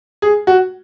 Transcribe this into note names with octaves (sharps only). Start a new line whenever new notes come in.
G#4
F#4